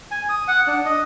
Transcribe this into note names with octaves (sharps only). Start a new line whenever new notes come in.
G#5
D#6
F#5
D4
D#5